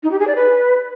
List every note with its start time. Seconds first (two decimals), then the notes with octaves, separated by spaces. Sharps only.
0.03 D#4
0.11 G4
0.19 G#4
0.27 D5
0.36 B4